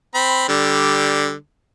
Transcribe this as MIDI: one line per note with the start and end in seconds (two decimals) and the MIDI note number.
0.14 0.44 60
0.14 0.44 83
0.48 1.33 50
0.48 1.33 55